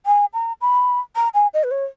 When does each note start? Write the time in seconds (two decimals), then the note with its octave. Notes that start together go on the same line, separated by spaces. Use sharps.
0.06 G#5
0.34 A#5
0.61 B5
1.16 A#5
1.34 G#5
1.54 D#5
1.64 B4
1.71 C#5